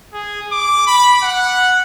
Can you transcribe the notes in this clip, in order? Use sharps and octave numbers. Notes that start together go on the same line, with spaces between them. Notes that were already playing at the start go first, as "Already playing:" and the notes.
G#4
D6
B5
F#5